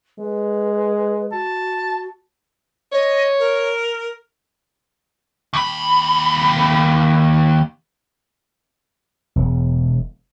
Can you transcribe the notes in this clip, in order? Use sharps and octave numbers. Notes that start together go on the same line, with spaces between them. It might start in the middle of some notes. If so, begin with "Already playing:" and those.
G#3 B4
F#4 A5
C#5 D#5
A#4
D#2 B5
E1